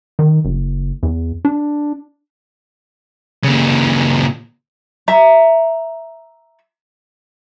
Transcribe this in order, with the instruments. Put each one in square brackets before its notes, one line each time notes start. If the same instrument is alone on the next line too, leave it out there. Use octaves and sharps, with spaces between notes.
[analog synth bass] D#3
F#1
E2
D4
[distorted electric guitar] A#2 C#3
[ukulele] E5 A#5